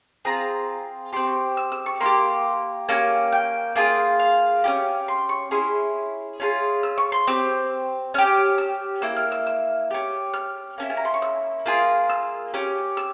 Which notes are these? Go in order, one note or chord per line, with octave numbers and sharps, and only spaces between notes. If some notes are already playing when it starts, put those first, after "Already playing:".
C4 F4 G#4 A#5
C4 G4 C6
C#6
E6
E6
C#6
A#3 E4 C6
G4
A#3 C#4 G4 G#5
G5
A#3 F4 G#4
F5
C#4 E4 G4
C6
C#6
C#4 E4 G#4 C6
C#4 F4 G#4
E6
C#6
C6
C4 G4 E6
C#4 G4 F6
E6
A#3 E4 E6
F6
E6
E6
C#4 G4
F6
A#3 C#4 E4
G#5
A#5
C6
C#6
E6
A#3 F4 G#4
E6
C#4 G4
E6